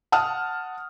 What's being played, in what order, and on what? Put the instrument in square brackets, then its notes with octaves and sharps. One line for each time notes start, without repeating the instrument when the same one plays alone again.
[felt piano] F#5 A5 D#6 F6